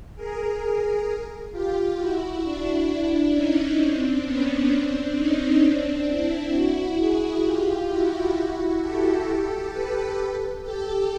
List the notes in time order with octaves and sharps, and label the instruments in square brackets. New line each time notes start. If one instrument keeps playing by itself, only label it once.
[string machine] G#4 A#4
F4 G4
E4 F#4
D4 E4
D4 E4
C#4 D#4
C4 D4
B3 C#4
C4 D4
C#4 D#4
C4 D4
D4 E4
E4 F#4
F#4 G#4
F4 G4
E4 F#4
G4 A4
G4 A4
A4 B4
G4 A4